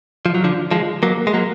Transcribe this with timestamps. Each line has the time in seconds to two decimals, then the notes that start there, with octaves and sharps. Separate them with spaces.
0.26 F3
0.35 F#3
0.44 D3 F3
0.71 F3 G#3
1.03 F#3 A#3
1.27 G#3
1.33 F#3 A#3